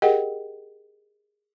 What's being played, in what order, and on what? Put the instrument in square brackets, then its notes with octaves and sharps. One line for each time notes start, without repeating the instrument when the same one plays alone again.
[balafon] G4 G#4 A#4 D#5 F#5 G5